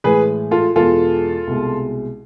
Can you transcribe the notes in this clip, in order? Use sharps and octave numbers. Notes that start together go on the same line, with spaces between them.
A2 E3 G#3 G#4 B4
F4 A4
E2 B2 G#3 F4 A4
C2 B2 G#3